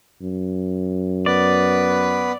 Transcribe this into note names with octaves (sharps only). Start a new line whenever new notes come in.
F#2
B3 B4 D5